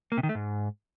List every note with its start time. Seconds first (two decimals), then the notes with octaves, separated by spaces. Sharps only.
0.12 A#3
0.18 C3
0.23 D#3
0.29 A3
0.35 G#2